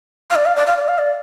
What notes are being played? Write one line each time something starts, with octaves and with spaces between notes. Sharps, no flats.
F5
D5
F5
D5
F5
D5
F5
D5